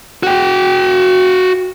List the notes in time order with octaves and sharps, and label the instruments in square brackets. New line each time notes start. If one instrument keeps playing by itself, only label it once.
[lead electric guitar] F#4 G5